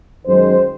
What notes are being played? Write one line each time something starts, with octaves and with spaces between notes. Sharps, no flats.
F#2 D#3 G#3 C5